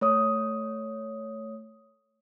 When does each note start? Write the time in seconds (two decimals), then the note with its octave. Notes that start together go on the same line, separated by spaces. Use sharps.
0.01 A3 C#5 D#6